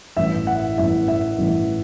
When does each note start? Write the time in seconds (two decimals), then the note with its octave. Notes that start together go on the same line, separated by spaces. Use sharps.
0.17 A1 G2 E3 E5
0.47 F#5
0.77 A1 G2 E3 E5
1.08 E5
1.39 A1 G2 E3